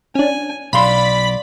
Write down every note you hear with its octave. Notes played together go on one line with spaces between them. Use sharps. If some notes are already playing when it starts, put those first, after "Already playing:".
C#4 D4 G#5
B1 D5 F5 B5 C6